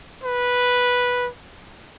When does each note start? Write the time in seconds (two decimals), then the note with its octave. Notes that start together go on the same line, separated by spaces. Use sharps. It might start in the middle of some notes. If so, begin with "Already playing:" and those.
0.24 B4